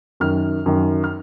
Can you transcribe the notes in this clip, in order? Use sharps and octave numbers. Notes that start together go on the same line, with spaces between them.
F#2 D#3 F6
F#2 D#3
F6